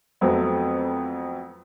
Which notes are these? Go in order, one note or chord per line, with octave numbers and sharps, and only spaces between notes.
F2 F#3 A3 B3 C4